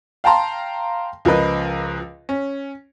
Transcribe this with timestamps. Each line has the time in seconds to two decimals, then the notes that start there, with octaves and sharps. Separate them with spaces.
0.24 F5 G5 A5 A#5 C6
1.25 C#2 F3 A#4 B4 D#5
2.29 C#4